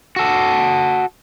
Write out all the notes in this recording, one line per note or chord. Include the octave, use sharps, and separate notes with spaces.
F#4 A4